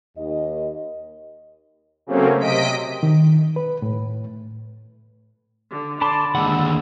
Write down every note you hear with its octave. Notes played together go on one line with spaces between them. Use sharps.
D#2 D#5
C#3 F#3 A3 A#3 C4 C#4
C3 D#5 B6 D7
D#3
B4
A2
D3
D3 D5 A5 B5 C6
D#2 D3 G#3 F#5 E6